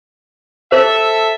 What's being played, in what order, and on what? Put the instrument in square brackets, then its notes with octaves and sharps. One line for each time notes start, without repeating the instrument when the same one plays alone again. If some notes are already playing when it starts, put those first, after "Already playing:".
[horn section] A4 E5 [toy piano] C5